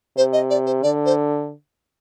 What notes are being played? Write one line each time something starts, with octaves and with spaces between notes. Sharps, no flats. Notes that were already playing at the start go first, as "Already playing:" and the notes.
C3 C5
D#5
D5
C5
D3 D5
C5